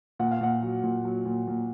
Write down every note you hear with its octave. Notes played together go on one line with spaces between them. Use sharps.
A#2 F#5
F5
A#2 F#5
F#3
A#2
F#3
A#2
A#2